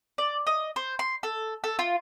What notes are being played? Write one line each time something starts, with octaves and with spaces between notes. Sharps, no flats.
D5
D#5
C5
C6
A4
A4
F4